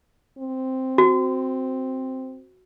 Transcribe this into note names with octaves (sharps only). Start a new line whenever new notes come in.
C4
F#4